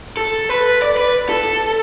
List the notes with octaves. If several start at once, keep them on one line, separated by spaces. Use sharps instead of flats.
A4
B4
D5
B4
A4